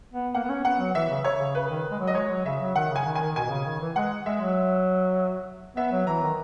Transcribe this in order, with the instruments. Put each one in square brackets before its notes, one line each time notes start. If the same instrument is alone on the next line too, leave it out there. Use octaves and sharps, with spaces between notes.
[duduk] B3
[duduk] A#3 [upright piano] F#5
[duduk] B3
C#4
[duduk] B3 [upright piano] F#5
[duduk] F#3
[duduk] E3 [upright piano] E5
[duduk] C#3
[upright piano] C#5
[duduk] C#3
[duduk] C#3 [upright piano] B4
[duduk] D#3
G#3
F#3
[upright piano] D#5
[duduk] G#3 [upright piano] C#5
[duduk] F#3
[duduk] C#3 [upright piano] E5
[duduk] F#3
[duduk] D#3 [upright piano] F#5
[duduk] C#3
[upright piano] G#5
[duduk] D#3
[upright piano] G#5
[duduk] D#3
[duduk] B2 [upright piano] G#5
[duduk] B2
C#3
D#3
E3
[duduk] G#3 [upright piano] F#5
[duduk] G#3 [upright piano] E5
[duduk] F#3
[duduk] B3 [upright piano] E5
[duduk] F#3
[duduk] E3 [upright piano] A#5
[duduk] D#3